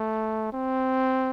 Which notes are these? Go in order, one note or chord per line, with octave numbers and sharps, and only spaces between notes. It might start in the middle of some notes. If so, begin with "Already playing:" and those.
Already playing: A3
C4